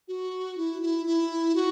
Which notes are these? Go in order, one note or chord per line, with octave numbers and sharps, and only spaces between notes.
F#4
E4
E4
E4
F#4